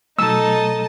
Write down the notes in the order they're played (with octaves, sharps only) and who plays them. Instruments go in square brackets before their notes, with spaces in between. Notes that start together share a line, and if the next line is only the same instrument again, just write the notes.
[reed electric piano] B2 F#3 A3 [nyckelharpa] D#4 A4 [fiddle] D#5 A5 [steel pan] E6